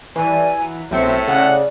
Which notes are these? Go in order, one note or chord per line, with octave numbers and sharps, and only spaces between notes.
A2 E3 G3 G#5
F#3
B1 A2 C4 E5 C#7
C#3 D4 F#5